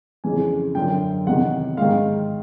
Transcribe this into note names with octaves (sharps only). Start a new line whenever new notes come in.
F2 C#3 E3 G#5
F#2 D3 G5
E2 C3 D#3 F#5
G#2 D#3 F5